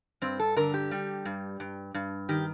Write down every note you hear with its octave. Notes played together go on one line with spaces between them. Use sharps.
G2 C4
A4
D3 A#4
G4
G3
G2
G2
G2
D#3 G4